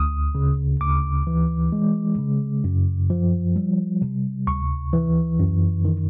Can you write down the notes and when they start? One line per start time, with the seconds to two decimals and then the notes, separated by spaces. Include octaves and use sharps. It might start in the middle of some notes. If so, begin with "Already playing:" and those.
Already playing: D2 D#6
0.35 C#3
0.81 D2 D6
1.27 E3
1.72 G#3
2.18 C#3
2.64 F#2
3.10 F3
3.56 G3
4.02 C3
4.47 D2 C#6
4.93 E3
5.39 F#2
5.85 D#3